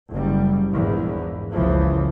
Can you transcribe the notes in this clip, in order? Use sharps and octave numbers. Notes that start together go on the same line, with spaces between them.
F#1 G3
A#1 E2 G#2
F#1 C#2 E3 F3